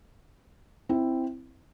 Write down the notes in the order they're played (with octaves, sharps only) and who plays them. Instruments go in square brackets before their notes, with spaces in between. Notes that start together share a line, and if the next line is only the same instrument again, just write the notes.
[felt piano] C4 E4